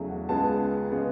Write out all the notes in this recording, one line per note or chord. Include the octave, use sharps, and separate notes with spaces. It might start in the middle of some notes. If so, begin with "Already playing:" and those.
Already playing: E2 C#3 F#3 A3
F#5
C#2 C#3 G#3 B3 A5
C#3 G#3 B3